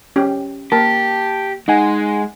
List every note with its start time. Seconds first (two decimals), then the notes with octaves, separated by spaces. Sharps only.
0.16 C#4 G4
0.72 A#3 G4 A#4 A5
1.68 G#3 D#4 F#5 G#5